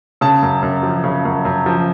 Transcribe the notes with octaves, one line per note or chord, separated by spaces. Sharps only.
C#3 A5
F#2
F#2
F3
C#3
F#2
F#2
F3